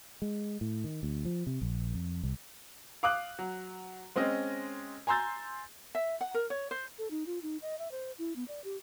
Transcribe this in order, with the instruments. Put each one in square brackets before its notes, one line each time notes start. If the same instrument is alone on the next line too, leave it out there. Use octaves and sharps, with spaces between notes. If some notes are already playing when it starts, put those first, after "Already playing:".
[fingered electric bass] G#3
A2
D#3
D2
F3
C3
A#1
F2
C2
[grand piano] F5 D6 D#6 F#6
F#3
G#3 C4 C#4 D#5
G#5 A#5 C6 E6 G6 A6
[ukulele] E5
F#5
A#4
C#5
C5
[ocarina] A4
D#4
F4
D#4
D#5
E5
C5
E4
B3
D5
G4